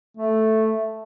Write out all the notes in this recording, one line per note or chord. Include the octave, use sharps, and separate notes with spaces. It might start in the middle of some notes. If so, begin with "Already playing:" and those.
A3